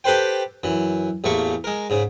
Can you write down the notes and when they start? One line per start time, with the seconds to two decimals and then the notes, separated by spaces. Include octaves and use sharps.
0.04 G4 A4 B4 C5 G5
0.63 F#2 E3
1.24 A1 E2 A3 A#3 C#6
1.64 G#3 A#4
1.90 G#2 C#3